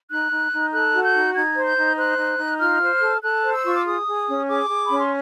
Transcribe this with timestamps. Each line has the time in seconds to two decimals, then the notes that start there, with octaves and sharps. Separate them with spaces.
0.10 D#4 F#6
0.30 D#4
0.52 D#4
0.72 A4 F#6
0.93 F#4
1.03 G6
1.14 D#4
1.34 D#4 G#6
1.56 C5
1.66 G6
1.76 D#4
1.97 C5 F#6
2.18 D#4
2.38 D#4
2.60 F4 F6
2.81 C5
3.01 A4
3.22 A4 F#6
3.43 C5
3.54 E6
3.65 F4 C#6
3.75 D6
3.85 G#4 D#6
4.06 G#4
4.27 C#4
4.47 G#4 D6
4.68 G#4
4.86 C#4 B5
4.99 C6